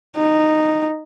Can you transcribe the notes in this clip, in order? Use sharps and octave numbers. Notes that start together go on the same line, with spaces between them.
D#4